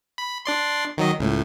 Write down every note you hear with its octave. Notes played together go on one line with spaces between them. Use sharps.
B5
D4 D5 C6
D#3 F#3 D#5
C#2 A2